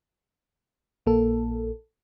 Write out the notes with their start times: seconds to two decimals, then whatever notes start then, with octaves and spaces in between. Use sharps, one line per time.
1.06 A#1 A#3 A4